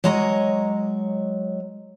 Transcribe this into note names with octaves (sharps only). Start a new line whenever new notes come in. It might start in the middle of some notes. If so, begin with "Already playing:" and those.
F#3 G#3 C#5 D#5 A#5